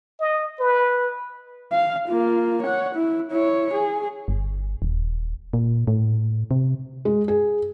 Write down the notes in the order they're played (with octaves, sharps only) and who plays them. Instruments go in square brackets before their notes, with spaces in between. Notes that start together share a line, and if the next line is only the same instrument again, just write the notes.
[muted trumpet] D#5
B4
[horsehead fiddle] F5
A#3 F4
C#5 F#5
E4
E4 C#5
G#4
[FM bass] G1
D#1
A#2
A2
C3
[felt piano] G#3
G#4